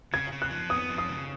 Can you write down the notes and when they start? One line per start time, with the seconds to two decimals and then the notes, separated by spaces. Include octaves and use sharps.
0.13 C#3 G#6
0.32 C#3
0.42 F#6
0.51 F3
0.70 B3 D#6
0.89 F3
0.98 D#6
1.08 C#3